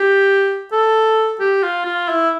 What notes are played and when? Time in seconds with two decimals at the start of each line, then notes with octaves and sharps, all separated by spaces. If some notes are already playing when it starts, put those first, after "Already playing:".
Already playing: G4
0.72 A4
1.40 G4
1.63 F4
1.85 F4
2.09 E4